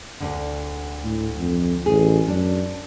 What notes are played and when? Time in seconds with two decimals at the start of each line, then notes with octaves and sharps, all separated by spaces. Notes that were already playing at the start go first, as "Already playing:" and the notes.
0.20 D2 G#2 D3
1.04 A2
1.38 F2
1.86 A1 G#4
2.28 F#2 D4